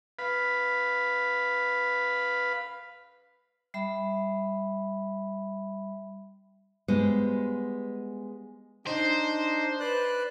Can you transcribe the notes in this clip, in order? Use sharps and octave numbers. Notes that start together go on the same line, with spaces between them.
B4 F5 B5
G3 E5 B5
G3 G#3 B3 C5 D#5
D4 D#4 C5
B4 D5 F#6